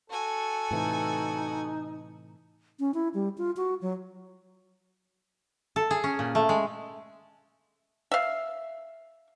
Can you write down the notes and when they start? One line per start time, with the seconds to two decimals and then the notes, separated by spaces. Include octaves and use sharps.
0.10 F#4 A4 G#5
0.71 A2 C3 E3 D#4
2.80 C#4
2.94 E4
3.14 G3
3.38 F4
3.57 F#4
3.82 F#3
5.76 A4
5.91 G#4
6.04 C#4
6.19 A#2
6.35 A3
6.49 G#3
8.12 E5 F5